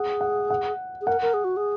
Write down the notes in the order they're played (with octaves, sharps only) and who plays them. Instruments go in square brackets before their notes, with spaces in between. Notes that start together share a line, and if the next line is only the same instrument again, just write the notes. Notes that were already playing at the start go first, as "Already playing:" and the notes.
Already playing: [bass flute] G#4 [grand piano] F#5
[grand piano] F#5
F#5
[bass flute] G#4
[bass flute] A#4 [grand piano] F#5
[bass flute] A#4
G#4
F#4
G#4